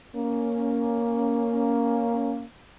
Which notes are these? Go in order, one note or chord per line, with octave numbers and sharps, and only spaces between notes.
A#3 C#4